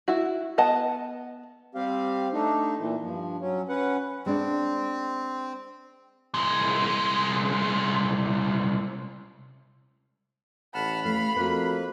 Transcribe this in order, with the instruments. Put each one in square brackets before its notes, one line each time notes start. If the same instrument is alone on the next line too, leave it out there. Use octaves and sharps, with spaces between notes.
[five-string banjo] E4 F#4
B3 D#5 F#5 A5
[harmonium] G3 C4 G4 F5
A3 D4 D#4
A#2 E3
G2 F3
F#3 C#4
C#4 B4 F#5
[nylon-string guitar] G#3 D4 [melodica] C4
[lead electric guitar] C2 G#3
[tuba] A1 [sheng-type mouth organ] F#5 A5 F6 [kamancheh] B5
[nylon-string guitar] A3 [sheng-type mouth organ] F5 F6
[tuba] F2 [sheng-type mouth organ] A#3 B4 [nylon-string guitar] F#4 C5